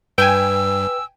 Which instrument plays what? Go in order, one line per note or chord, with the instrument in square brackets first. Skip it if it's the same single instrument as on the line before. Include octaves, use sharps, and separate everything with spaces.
[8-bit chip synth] G2 [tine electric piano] B4 [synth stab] G5 G#5 [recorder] E6